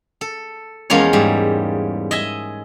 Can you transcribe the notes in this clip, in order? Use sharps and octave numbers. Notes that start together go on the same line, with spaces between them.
A4
E2 F3 G#3 A#3 C#4 C#5
G#2 G3
D#5 E5 G#5